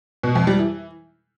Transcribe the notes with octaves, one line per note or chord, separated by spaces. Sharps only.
B2
F2
G3
E3